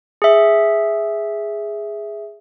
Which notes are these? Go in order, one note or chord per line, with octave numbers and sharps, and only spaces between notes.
G#4 E5